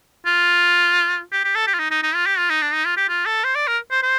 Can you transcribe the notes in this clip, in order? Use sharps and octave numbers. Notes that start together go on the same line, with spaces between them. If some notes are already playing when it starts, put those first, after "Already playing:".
F4
G4
G4
A4
G4
F4
D#4
D#4
D#4
F4
G4
F4
D#4
D4
D#4
F4
G4
F4
A4
C5
D5
A#4
C5
C5